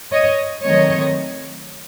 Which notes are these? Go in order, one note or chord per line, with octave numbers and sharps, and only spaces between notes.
C#5 D#5
D#3 F#3 A3 C4 C#5 D#5